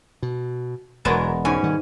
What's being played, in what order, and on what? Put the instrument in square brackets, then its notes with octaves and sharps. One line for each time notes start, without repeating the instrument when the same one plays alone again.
[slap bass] B2
[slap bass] E1 [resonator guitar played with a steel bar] B2 F#3 A#4 [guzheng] G#3 B3 A5
[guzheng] G#2 [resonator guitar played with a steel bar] B2 C#4 G#5
[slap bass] D#3 G3